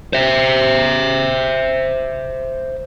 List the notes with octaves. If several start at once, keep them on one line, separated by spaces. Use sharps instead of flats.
C5 E5